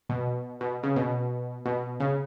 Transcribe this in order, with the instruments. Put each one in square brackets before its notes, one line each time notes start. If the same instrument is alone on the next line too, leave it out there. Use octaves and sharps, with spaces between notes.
[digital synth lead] B2
B2
C#3
B2
B2
C#3